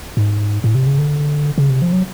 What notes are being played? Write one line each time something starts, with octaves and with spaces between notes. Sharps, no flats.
G#2
A2
C3
C#3
D3
C#3
C3
F3
F#3